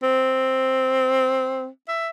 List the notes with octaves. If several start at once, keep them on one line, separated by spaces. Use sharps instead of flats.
C4
E5